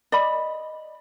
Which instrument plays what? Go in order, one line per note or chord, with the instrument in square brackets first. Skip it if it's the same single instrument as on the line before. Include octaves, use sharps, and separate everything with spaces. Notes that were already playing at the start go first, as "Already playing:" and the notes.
[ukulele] D5 D#5 B5